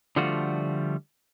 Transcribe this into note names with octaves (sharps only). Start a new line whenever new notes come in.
D3 F3 G3 A3 F4 F#4